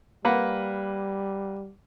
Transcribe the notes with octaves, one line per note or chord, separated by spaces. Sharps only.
G3 A#3 B4 F#5